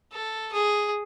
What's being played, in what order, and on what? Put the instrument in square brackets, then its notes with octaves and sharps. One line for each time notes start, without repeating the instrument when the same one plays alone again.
[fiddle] A4
G#4